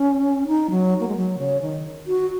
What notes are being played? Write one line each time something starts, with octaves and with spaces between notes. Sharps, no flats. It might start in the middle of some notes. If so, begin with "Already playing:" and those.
Already playing: C#4
D#4
F#3
A#3
G#3
F#3
C#3
D#3
F#4